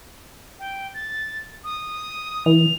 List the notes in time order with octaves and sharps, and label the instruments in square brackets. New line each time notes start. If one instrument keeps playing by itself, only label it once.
[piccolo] G5
A6
D#6
[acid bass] E3 [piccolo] F7